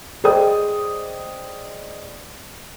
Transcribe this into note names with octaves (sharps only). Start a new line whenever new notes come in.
G#4 C5 D5 D#5 G5 D#6